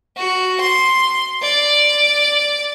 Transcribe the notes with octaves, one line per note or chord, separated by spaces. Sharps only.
F#4
C6
D5